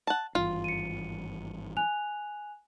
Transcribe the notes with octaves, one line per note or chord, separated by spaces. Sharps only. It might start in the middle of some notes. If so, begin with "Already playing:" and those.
F#5 A5
G#1 G2 E3 F4
C#7 D#7
G#5 F#6 F7